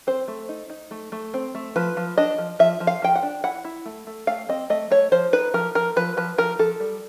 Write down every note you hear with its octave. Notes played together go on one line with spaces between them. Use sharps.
C4 C5
A3
D#4
D#4
A3
A3
C4
A3
F3 B4
F3
D4 D#5
F3
F3 E5
F3
F5
F3 G5
F#5
D4
E4 F#5
E4
A3
A3
A3 F5
C4 D#5
A3 D#5
A3 C#5
F3 C5
D#4 B4
F3 A#4
F3 A#4
F3 B4
F3 B4
F3 A#4
F3 A4
G3